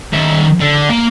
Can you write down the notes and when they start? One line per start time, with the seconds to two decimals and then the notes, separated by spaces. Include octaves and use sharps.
0.13 D#3 E5
0.60 D3
0.90 A#3